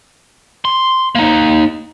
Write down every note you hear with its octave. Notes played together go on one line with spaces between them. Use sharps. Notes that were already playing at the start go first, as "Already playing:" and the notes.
C6
A#3 D#4